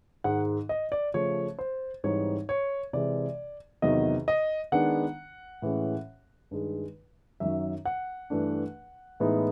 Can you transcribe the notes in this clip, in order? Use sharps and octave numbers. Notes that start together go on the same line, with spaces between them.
G#2 D#3 G#3 F#5
D#5
D5
C#3 F3 A3 C#4 C#5
C5
G#2 E3 G3 C4 D#4 C#5
C#5
C3 E3 G#3 D5
E2 C3 D#3 F#3 D#5
D#5
D#3 G#3 B3 D4 F#5
A2 E3 G#3 C#4
G2 D#3 G#3
F#2 D#3 F#3 E5
F#5
G2 E3 A3 D4
A2 E3 G#3 B3 D#4